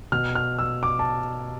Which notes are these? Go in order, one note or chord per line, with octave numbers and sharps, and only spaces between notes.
B2 F6
F6
E6
D6
A5